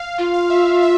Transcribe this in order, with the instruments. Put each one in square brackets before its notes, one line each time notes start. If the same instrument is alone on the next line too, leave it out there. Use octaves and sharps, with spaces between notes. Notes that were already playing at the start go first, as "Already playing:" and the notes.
Already playing: [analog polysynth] F5
[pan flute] F4
[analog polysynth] F5
E5
E5
E5